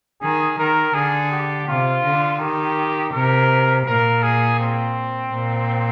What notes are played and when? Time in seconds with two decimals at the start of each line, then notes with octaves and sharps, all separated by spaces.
0.22 D#3 G#4
0.58 D#3 A#4
0.94 D3 G#4
1.32 G4
1.68 C3 F4
2.04 D3
2.40 D#3 G4
3.13 C3 A#4
3.87 A#2 A#4
4.23 G#4
4.60 C4
5.32 A#2